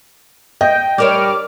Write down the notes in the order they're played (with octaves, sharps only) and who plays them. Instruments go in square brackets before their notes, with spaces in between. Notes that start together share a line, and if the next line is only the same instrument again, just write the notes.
[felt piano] D#5 [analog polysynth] G5
[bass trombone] G3 [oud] D4 A#4 C#5 [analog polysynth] D6 F6